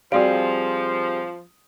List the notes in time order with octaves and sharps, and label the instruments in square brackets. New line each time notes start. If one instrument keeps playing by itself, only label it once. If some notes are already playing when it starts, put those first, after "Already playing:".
[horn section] F3 [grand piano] G3 C4 G#4 [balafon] F#4 D5 F5